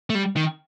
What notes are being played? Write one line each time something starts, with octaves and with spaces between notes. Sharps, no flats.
A3
G3
D#3